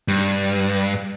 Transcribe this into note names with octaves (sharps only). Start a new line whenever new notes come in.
G2